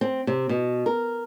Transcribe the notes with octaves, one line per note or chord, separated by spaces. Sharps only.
C4
C3
B2
A#4